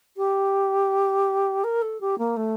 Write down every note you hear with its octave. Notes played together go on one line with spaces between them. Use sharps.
G4
A#4
A4
G4
A#3
A3